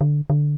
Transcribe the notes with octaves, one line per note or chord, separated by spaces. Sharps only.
D3
D3